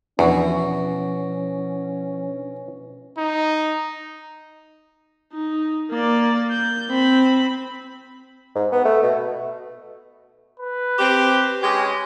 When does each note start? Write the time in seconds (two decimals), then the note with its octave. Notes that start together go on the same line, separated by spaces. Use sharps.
0.19 E2 B2 F3 C#4 D4 E4 F#4
3.17 D#4
5.33 D#4
5.91 A#3 D5
6.51 G6
6.91 C4 B5
8.55 G#2
8.72 B3
8.85 A3
9.03 B2
10.60 B4
10.98 C4 G4
11.61 G#3 C#4 G4